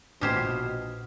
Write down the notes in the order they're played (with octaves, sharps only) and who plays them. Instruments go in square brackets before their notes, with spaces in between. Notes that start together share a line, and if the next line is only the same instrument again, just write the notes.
[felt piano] A#1 [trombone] B2 [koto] D#4 G4 C5 [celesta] D#6 F6 G#6